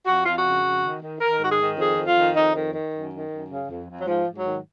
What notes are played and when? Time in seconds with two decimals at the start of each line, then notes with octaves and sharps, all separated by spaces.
0.06 F2 F#4
0.25 F2 F4
0.35 F#4
0.44 C#3
0.64 F2
0.83 D#3
1.01 D#3
1.21 D#3 A#4
1.39 G#2 F#4
1.49 G#4
1.59 D#3
1.78 F2 G#4
1.96 F2
2.06 F4
2.16 D#3
2.35 F2 D#4
2.55 D#3
2.73 D#3
2.92 F#2
3.11 D#3
3.30 F#2
3.49 C#3
3.69 F2
3.88 F2
3.99 F#3
4.06 G#2 F3
4.25 G#2
4.35 F#3
4.45 D#3